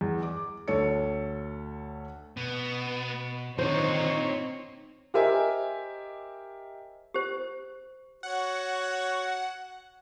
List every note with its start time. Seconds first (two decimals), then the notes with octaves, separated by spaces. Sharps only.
0.01 E2
0.22 D6
0.68 D2 A4 C#5 C#7
2.37 B2 B3
3.58 D3 D#3 A#3 C4 D#4 F4 C5 C#5
5.14 G4 A#4 C5 D#5 E5 G#5
7.14 G4 C5
8.23 F#4 C#5 F#5